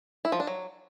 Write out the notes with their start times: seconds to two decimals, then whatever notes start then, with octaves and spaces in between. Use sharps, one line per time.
0.25 E4
0.32 F3
0.40 D4
0.47 F#3